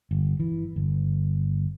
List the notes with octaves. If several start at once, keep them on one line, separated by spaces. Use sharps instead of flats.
G1
E3
G1